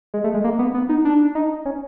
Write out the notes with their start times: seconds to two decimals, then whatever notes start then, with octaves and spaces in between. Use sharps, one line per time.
0.14 G#3
0.24 A3
0.34 G#3
0.44 A#3
0.59 B3
0.74 B3
0.89 D#4
1.05 D4
1.35 D#4
1.65 C#4